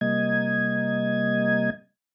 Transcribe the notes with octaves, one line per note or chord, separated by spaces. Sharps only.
C3 G3 A#3 D#5 G#6